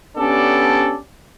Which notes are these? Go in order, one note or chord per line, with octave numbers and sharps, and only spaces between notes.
B3 C#4 D4 G4 A4 D5